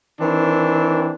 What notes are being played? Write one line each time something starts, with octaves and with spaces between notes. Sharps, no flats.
D#3 E3 C4 D4